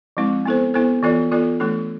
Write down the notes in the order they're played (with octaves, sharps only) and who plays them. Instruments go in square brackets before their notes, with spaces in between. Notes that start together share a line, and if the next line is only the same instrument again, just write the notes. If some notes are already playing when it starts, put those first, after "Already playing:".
[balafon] F3 G#3 C4 E4
B3 E4 A4 C5
B3 E4 A4 C5
E3 B3 F4 A4 D5
E3 B3 F4 A4 D5
E3 A3 D4 A4